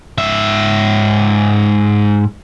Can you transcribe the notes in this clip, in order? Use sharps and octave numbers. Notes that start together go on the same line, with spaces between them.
G#2 E5